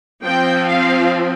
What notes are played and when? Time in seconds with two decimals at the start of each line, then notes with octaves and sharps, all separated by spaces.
0.23 F3 C4 G5
0.69 F5